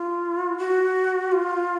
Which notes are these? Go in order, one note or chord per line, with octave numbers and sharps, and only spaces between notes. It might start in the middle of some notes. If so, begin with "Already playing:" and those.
Already playing: F4
F#4
F4